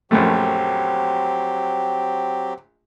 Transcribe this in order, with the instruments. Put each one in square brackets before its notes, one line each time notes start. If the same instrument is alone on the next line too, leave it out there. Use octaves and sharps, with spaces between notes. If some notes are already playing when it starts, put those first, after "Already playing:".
[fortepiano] A#1 F#2 A3 [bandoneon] F#3 C4 G4